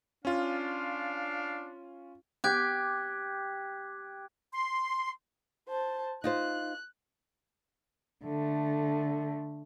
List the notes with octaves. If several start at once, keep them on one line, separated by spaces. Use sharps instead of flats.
C#4 D4 F4 F5
G4 D6 F#6 G#6
C6
C5 A5
D#4 F4 C5 F#6
D3 A3